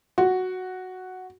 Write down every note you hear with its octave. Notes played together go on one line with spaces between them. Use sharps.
F#4